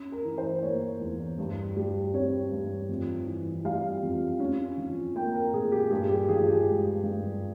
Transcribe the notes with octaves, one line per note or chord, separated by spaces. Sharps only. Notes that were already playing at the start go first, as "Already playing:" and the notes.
Already playing: C#4
A#4
E3
C5
A#3 C#5
E2
G2
G3
C4 C#5
G2
F2
E3
G3 F5
F2
C#4
F3
A#3 G5
A#4
A#2 G#4
G4
G2 G#4
G4
F3 G#4
G4
G#3
G2